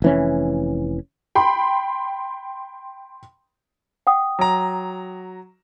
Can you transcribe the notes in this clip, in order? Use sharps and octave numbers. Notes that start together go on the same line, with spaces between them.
F1 E3 C#4
G5 B5 C6
F#5 G5 D#6
F#3 A#5